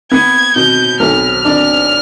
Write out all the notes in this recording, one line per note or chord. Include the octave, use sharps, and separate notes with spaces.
B3 G#6
B2 G6
B1 F6
D4